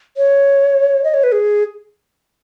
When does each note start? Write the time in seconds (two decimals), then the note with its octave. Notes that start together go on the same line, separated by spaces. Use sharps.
0.17 C#5
1.04 D#5
1.14 C#5
1.24 B4
1.33 G#4